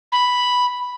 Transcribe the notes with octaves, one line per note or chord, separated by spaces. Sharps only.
B5